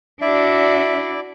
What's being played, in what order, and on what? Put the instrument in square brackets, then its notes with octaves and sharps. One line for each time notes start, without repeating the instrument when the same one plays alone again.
[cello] D4 F#4 [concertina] E4 D5 [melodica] E5